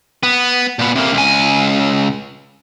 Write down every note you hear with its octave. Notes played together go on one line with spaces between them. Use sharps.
B3
A#2 B3
C3 A#3
C#2 G#5